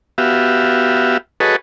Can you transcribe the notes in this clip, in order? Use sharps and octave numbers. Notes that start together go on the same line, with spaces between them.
B3 F#4 G4 E5 F5
F#4 G#4 A4 B4 C#5 D#5